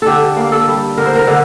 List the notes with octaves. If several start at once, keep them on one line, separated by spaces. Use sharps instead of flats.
D3 G4 A4
A#3
A4
G3
D3 A#4
C5
A#4
D3